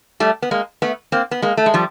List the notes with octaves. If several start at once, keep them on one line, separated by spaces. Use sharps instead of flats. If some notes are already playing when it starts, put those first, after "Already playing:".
G3 A3
B3
G#3 A#3
A3 B3
A#3 C4
B3
G#3 A#3
A3
G#3
F3 G3